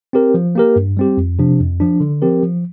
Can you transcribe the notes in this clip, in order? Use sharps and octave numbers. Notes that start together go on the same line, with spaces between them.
C4 G4 A#4
F3
A#3 G4 A#4
G2
G3 C4 G4
F2
C3 F3 D4
F2
F3 D4
D3
F3 C4 G4 A#4
F3